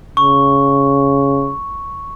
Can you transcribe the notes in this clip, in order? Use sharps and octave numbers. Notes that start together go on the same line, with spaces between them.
C#3 C#6